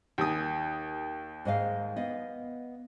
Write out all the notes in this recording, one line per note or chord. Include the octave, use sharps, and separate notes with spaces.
D#2 G4 G#5 D#6
G#2 D#5 F5
B3 D#5 F5